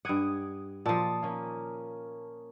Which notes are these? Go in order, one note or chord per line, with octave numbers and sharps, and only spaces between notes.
G2 F#5 D#6 G#6 D7
A#2 F3 A5 D#6
A#3 C#4